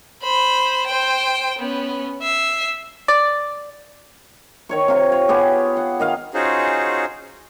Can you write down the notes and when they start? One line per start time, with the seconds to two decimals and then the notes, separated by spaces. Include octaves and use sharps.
0.23 C5 B5
0.87 C5 G5
1.59 B3 C#4
2.23 E5 C7
3.08 D5
4.69 D#3 C#5 C#6
4.88 C3 F4
5.12 C#5
5.29 B3 G4 G#4
5.77 F#5
6.00 D#3 D#5 F5
6.34 C#4 D#4 F4 F#4 G#4 C5